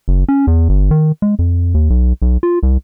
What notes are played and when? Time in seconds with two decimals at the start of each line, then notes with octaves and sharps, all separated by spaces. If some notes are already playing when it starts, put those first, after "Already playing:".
0.08 F#1
0.28 C#4
0.47 E2
0.69 G1
0.91 D#3
1.22 G#3
1.39 F2
1.74 D#2
1.90 B1
2.22 B1
2.43 F4
2.63 C2